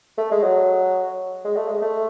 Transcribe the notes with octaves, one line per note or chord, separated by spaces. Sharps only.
A3
G#3
F#3
G#3
A3
G#3
A3